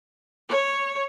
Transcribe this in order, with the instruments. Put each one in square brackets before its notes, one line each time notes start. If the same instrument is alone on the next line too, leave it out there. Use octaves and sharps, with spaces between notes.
[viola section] C#5